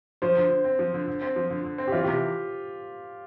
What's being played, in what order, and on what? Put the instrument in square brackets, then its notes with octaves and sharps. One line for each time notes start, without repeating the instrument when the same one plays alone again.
[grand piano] F3 [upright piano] C5
[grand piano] D3
D3
C4
F3
D3
D3
C4
F3
D3
D3
C4
[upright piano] G4
[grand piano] E3 [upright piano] F4
[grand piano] C3 [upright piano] G4